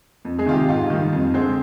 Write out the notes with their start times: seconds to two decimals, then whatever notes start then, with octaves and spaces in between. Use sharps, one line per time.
0.25 F2
0.39 G#3 G#4
0.46 C3 D#3 F4
0.53 G4
0.69 G#2 F4
0.90 D#3 G3
1.12 F2
1.34 D3 G#3 C4